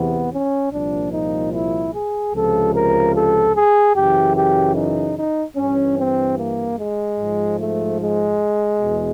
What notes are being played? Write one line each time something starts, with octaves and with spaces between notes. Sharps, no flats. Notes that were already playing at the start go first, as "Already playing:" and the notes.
Already playing: E2 C3 E3 B3
C#4
C2 A#2 F3 D4
D#4
E4
G#4
C#2 C3 F3 A4
A#4
A4
G#4
F#2 C#3 E3 G4
G4
D#4
D#4
G2 E3 C#4
C4
A#3
G#3
G#2 F3
A3
G#3
E2 B2